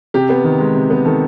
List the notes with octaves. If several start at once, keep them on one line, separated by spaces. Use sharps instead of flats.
C3 G4
B3
D#3
G#3
C3
B3
D#3 A4